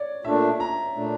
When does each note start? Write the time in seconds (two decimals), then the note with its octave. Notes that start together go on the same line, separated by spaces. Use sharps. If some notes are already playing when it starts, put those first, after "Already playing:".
Already playing: C#5 D5
0.25 A#2 A3 D4 E5
0.60 A#5
0.95 A#2 A3 D4